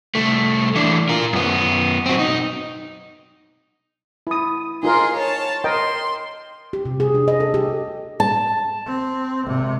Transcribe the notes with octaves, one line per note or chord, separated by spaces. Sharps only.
C2 A3
E3 D4
F4 A#4
F#2 B3
C4 F#4
B1 D#4
E4 D#6
D#4 F4 G#4 A#4 C6
C#5 A5
A#4 D#5 G5 C6
G4
C3
G#4
D4
D#5
A4
G4
A5
C4
G#1 C3